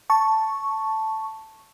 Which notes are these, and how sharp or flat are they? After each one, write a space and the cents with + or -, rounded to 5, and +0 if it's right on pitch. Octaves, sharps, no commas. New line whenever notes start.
A5 +0 C#6 +0